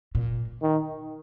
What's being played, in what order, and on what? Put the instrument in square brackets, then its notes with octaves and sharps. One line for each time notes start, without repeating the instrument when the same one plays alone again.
[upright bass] A#2
[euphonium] D#3